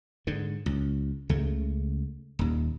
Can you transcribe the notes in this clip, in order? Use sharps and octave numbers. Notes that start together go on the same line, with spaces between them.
G#2 D3
C#2
C#2 C#3 A3
D#1 D#2